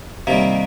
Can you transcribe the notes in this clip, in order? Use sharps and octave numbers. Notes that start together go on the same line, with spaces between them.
C3 D#3 G3 A#3